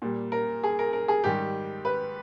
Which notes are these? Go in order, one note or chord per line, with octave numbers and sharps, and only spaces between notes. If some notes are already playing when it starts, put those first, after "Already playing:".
A#2 G3
A#4
G#4
A#4
A#4
G#4
G#2 D#3 G3 G4
B4